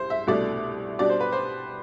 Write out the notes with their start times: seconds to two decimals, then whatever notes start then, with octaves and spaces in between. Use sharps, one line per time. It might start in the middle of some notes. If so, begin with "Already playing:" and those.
Already playing: C2 C5
0.10 E5
0.27 C2 B2 A3 D4 D5
0.99 B2 G3 D4 D5
1.10 C5
1.21 B4
1.32 C5